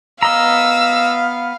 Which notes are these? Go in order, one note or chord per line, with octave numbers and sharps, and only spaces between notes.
B3 D#5 F5 A#5 E6